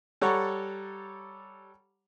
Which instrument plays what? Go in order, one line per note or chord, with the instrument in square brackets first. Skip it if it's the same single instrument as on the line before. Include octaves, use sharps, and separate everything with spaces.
[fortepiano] G3 A4 C#5 F#5 A#5 C#6